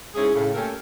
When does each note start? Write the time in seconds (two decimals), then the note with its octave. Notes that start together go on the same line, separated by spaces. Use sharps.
0.15 G#2 C#4 E4 G#4
0.34 A2 C#3
0.54 A3 A#3 C#4 G4 A4 A#4